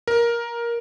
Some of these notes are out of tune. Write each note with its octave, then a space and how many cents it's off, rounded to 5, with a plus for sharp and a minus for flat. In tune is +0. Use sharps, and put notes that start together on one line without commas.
A#4 +10